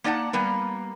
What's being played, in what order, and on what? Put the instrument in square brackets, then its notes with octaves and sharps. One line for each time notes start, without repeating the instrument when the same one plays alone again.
[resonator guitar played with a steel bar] A#3 D#4 D5 F#5 A5
G3 A#3 B3